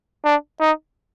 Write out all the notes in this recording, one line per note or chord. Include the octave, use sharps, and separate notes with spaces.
D4
D#4